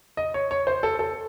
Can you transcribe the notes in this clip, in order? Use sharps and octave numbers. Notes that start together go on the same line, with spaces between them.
D#5
C#5
C#5
C5
A4
A4